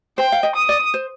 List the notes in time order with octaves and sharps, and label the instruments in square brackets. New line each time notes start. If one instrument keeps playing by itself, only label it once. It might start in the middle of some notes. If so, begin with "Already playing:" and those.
[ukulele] C5 [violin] G5
[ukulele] F5
D#5
[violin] D#6
[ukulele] D5
C5